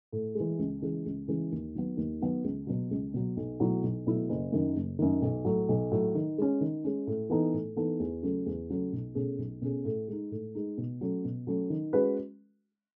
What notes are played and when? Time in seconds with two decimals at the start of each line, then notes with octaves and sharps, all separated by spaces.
0.12 A2
0.35 G#3
0.40 E3
0.59 C#2
0.81 C#3 E3 G#3
1.06 C#2
1.28 C#3 E3 G#3
1.52 D#2
1.75 D#3 F#3 B3
1.97 D#2
2.21 D#3 F#3 B3
2.44 C#2
2.67 B2 F#3
2.91 C#2
3.14 B2 F#3
3.37 B1
3.60 B2 F#3 A3 E4
3.83 B1
4.06 B2 F#3 A3 E4
4.29 F#1
4.52 F#2 D#3
4.75 F#1
4.99 F#2 D#3
5.22 B1
5.45 A2 F#3
5.69 B1
5.92 A2 F#3
6.15 D#3
6.38 G#3 C#4
6.61 D#3
6.84 G#3 C#4
7.07 A2
7.30 E3 B3 D#4 A4
7.53 A2
7.76 E3 B3 D#4 A4
8.00 E2
8.22 C#3 F#3 A3 C#4
8.46 E2
8.70 C#3 F#3 A3 C#4
8.93 B1
9.15 B2 A3 C#4 G#4
9.38 B1
9.62 B2 A3 C#4 G#4
9.85 A2
10.08 G#3 D#4
10.31 A2
10.55 G#3 D#4
10.78 B2
11.01 F#3 A3 C#4
11.25 B2
11.47 F#3 A3 C#4
11.70 D#3
11.93 G#3 C#4 F#4 B4